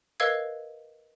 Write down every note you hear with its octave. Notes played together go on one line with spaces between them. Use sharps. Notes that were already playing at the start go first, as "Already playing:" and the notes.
A#4 B4 D#5 F5 E6 G#6